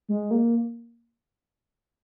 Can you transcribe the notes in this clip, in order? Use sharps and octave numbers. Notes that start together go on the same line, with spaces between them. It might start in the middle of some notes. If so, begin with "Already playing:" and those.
G#3
A#3